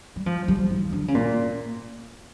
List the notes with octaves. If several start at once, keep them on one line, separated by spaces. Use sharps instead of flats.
G3
F3
G3
E3
D3
C#3
A#2